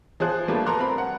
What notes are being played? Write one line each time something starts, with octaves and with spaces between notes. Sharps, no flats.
F3 G#4 C5 F#6
F3 G3 A3 A#3 D4 B4
A4 A#4 A#5 C6 F#6
C4 B5
F#5